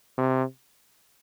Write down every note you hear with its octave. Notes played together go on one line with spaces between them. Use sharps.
C3